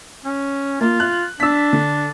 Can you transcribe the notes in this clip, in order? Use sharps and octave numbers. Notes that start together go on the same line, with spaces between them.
C#4
A#3 F4
F#6
D4 E6 B6
D3